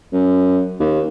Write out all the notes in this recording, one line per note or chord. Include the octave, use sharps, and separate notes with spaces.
F#2
D#2